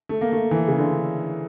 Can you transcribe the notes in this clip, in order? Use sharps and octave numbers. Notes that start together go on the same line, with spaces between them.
A3
A#3
A3
E3
C#3
D3